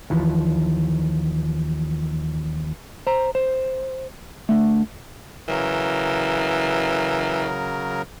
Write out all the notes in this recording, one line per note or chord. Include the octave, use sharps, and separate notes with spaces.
D#2 E3 F3
C5 A#5
C5
D2 D3 A3
C#3 E3 F#3 A#4